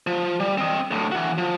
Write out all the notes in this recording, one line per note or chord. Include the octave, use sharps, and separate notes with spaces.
F3
G3
C4 D#5
D2 A2
E3 F#4
F3